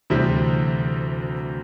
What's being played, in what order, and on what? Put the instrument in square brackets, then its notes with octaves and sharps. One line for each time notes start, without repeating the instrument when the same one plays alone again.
[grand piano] D2 C3 E3 G3 C4